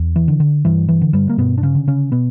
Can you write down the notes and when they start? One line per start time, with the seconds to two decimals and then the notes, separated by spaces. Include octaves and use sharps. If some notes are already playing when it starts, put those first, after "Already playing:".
Already playing: E2
0.16 E3
0.28 D3
0.40 D3
0.65 G2 E3
0.88 E3
1.02 D3
1.13 G2 G3
1.29 A#3
1.38 G2 B2 B3
1.58 D4
1.63 C#3 C#4
1.75 D3
1.88 C#3 C#4
2.12 B2 B3